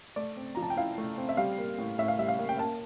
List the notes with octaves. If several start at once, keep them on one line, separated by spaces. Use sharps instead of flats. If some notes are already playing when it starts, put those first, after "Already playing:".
A3 D5
C4
F3 A#5
A5
G5
E4 F5
A3
C4
E5
G3 F5
A#3
A2
A2 E5
F5
G3 E5
F5
A#3
G5
A#3 A5